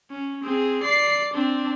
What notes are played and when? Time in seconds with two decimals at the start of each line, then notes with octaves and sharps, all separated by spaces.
0.11 C#4
0.44 C4 G#4
0.83 D5 C7
1.34 C4 D4